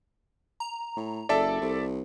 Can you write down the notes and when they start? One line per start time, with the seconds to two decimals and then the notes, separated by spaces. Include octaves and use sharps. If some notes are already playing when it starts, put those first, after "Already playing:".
0.60 A#5
0.96 A2
1.29 F#1 A4 D5 E5 A5
1.61 C2